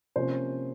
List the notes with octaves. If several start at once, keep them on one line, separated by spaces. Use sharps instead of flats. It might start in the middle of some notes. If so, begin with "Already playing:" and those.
C3 F3 A#3 C#4 C5